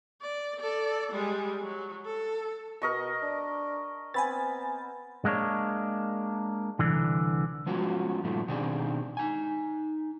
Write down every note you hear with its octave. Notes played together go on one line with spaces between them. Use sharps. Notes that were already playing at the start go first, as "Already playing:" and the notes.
D5
A4 D5
G3 G#3
F#3
A4
B2 A#4 D#5 C#6
D4
B3 C4 G#5 B5 A6
G#3 A#3 D4 C#5
C2 D3 E3
F3 G#3 B3 C#4 F4 F#4
G2 A#2 D#3 F3 A3
B2 D#3 C4 D4 G4 G#4
D#4 G#5